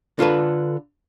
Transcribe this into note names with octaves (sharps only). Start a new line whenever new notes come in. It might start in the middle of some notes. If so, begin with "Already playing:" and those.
D3 F4 A4 B4